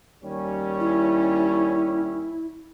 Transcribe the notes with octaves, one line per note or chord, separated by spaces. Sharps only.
D#2 G3 C#4
E4